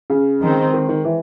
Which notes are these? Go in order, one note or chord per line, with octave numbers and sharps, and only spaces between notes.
C#3
D#3 G#3 C4 D#4
D#3
D#3
E3